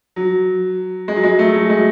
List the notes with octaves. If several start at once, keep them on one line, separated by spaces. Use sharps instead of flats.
F#3
G#3
F#3
G#3
F#3 A3
F#3
G#3